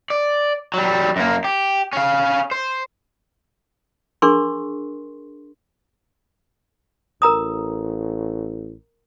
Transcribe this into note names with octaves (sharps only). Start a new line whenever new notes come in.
D5
F#3 G3
F#2 A#3
G4
C#4 F5
C5
D4 G#4 A#4 C6 C#6
A1 A#4 A#5 D#6